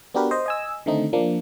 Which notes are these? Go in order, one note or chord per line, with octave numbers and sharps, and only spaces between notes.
B3 D4 F#4 G4 A#4 B4
C5 D#5
D#5 G#5 E6
D3 D#3 A3 C4 D#4
F3 A#3 D4